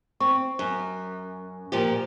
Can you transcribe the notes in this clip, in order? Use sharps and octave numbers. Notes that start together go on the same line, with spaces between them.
C4 C#6
F#2
A#2 F3 G4